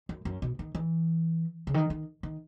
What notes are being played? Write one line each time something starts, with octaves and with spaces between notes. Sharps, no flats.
F#2
F#2
B2
D#3
E3
C#3
D#3
D#3
D#3